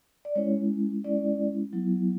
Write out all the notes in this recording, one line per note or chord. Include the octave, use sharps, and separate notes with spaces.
D5
G#3 C#4 E4 C#5
G#3 C#4 E4 D5
F#3 B3 E4